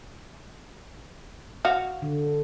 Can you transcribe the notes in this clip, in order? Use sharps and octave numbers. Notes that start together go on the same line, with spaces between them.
F#4 F5
D3